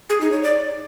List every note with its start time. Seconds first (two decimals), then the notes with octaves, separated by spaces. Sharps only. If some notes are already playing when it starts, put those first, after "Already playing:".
0.10 G#4
0.21 D#4
0.32 C#5
0.43 D5